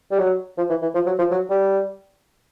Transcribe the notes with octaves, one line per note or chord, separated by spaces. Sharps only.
G3
F#3
F3
E3
E3
F3
F#3
F3
F#3
G3